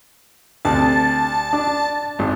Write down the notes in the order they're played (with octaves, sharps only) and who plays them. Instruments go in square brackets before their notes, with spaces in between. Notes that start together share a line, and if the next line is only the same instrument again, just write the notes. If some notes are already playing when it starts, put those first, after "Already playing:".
[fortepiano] D2 C3 [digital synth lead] A5
[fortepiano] D4 D6
G#1